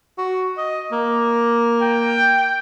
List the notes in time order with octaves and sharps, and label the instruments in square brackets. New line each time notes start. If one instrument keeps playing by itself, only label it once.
[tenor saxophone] F#4
D#5
A#3
[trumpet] G5